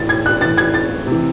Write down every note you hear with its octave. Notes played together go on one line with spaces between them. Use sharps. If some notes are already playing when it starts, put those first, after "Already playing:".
Already playing: A2 E3 A6
G#6
F#6
A2 E3 A6
G#6
A6
C3 E3